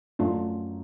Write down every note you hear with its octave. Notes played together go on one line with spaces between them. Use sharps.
F#2 A3 D4 F4